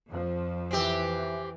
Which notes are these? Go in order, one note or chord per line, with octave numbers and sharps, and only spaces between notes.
F2 F3
E3 C4 G4